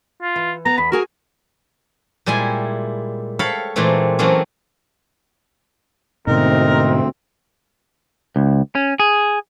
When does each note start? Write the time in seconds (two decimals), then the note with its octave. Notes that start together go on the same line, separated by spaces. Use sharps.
0.22 F4
0.36 E3
0.65 B3 A#5
0.78 E2 B5
0.92 F#4 G#4 A#4 G#5
2.26 A#2 G3 G#3 E4 G#5
3.39 A4 C#5 F5 G5 B5
3.76 A#2 E3 G#3 A3 C4
4.19 E3 F#3 A3 A#3 C4 C#4
6.27 D2 G#2 B2 D3 C4 D#4 A#4
8.36 C#2
8.75 C#4
9.00 G#4